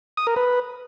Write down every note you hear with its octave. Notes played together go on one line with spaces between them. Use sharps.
D#6
A#4
B4